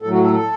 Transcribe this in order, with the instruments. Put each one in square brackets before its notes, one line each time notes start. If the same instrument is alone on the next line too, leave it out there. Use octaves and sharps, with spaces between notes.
[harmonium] A2 F#3 A4
F#4
A4
A4